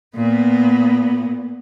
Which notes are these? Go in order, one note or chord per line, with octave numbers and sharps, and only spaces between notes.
A#2 B3